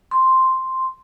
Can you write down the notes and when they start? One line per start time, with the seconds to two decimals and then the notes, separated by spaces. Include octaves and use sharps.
0.11 C6